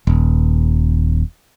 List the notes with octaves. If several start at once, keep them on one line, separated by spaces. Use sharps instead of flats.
D#1